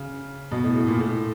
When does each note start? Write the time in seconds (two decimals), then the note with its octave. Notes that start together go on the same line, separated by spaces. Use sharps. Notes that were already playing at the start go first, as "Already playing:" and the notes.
Already playing: C#3
0.51 B2
0.64 A2
0.76 A2
0.88 A#2
1.00 A2